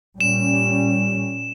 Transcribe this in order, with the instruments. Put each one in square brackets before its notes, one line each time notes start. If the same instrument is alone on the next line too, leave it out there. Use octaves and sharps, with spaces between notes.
[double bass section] A#2 G3 C#4 [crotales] E7